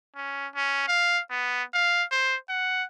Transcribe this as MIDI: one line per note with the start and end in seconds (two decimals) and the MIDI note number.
0.16 0.47 61
0.55 0.87 61
0.88 1.21 77
1.31 1.63 59
1.74 2.03 77
2.11 2.36 72
2.49 2.84 78